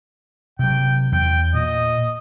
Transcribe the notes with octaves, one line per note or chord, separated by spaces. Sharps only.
C3 F#3 G5
E2 G5
A#2 D#5